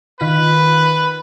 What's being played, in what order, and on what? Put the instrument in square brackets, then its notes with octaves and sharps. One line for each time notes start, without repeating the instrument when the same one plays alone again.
[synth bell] D#3 F4 B6 [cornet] B4